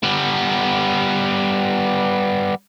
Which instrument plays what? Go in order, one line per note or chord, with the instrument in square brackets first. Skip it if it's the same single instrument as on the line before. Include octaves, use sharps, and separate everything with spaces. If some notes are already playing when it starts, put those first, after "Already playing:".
[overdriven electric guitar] G3 B3